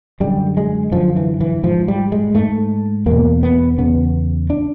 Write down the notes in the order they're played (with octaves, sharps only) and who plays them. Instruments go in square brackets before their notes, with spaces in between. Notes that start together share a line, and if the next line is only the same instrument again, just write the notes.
[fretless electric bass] F#2 D3 G3
G#3
F#2 D3 F3
E3
E3
G#2 F3
G3
G#3
G#2 A3
E2 B2 A#3
B3
E2 C#3 B3
D4